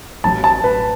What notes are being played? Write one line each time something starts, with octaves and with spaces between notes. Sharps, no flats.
A1 A2 F#3 A5
A5
B4